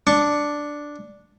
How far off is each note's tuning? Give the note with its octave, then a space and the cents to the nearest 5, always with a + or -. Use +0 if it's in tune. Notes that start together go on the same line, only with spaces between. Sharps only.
D4 +0 C#6 +0